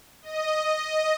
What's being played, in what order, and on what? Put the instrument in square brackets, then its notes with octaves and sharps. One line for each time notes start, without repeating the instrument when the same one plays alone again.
[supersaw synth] D#5